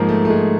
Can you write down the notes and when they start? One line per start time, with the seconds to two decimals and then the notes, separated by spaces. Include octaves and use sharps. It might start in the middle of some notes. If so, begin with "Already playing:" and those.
Already playing: G#2 F3 G#3 A#3
0.09 A3
0.25 A3
0.30 G#3